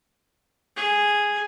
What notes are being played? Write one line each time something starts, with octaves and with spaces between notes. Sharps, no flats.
G#4